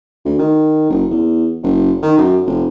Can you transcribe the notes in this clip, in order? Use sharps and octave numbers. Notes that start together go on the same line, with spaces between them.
D2
D#3
F#1
E2
F#1
D#3
F#2
F1